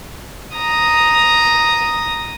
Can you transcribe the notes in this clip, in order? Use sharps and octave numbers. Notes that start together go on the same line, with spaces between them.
A#5 D#6